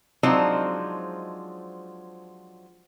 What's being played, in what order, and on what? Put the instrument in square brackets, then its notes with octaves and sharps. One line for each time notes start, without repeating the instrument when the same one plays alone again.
[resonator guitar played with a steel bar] F3 F#3 G#3 C4 D4 D#4